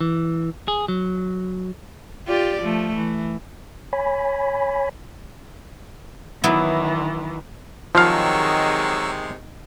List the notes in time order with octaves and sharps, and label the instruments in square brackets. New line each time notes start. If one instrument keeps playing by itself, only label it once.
[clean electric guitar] E3
G#4
F#3
[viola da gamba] F4 G4 D5
F3 A3
E3
[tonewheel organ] C#5 G#5 B5
[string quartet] D#3 E3 [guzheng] F#3 B3 E4
[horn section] C3 G#3 [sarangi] D#3 [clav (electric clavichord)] F3 F5 [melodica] F#3 C#6 E6